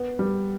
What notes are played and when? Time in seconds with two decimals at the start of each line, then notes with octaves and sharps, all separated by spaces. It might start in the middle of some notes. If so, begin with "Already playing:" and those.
Already playing: B3
0.19 G3